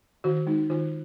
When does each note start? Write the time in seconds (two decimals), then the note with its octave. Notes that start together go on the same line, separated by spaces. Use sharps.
0.24 D#3 F#4
0.47 G#3 D#4
0.70 D#3 F4